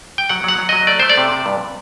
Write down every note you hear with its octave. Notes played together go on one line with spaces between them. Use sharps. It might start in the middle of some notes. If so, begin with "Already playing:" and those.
G5
F#3 F#5
F#3 F#5
F#3
F#3 D#5
A3 D5
A3 C5
D5
C3
C3
G2